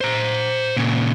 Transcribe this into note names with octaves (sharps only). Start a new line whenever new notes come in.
C5 A#5
A#2 C#3